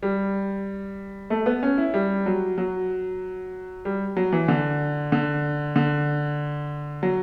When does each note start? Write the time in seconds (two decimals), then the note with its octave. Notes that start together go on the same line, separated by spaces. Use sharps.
0.02 G3
1.30 A3
1.46 B3
1.63 C#4
1.78 E4
1.94 G3
2.26 F#3
2.58 F#3
3.85 G3
4.17 F#3
4.33 E3
4.48 D3
5.12 D3
5.76 D3
7.03 F#3